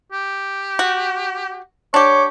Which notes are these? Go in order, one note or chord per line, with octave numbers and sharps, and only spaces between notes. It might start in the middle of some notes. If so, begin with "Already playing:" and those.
G4
F#4
D4 G4 C#5 D6